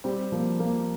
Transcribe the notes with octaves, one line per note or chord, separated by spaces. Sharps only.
G3 C4
F3 A#3
F3 A#3